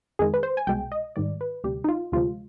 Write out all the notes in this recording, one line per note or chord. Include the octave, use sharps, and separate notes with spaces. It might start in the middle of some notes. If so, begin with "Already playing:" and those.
F2 D#3 G#3 G#4
B4
C5
G#5
C2 B2 G#3 G5
D#5
G#2 D#3 G3 D5
B4
D2 C3 G3 G4
D#4
F4
D2 C3 F3 G#3 F4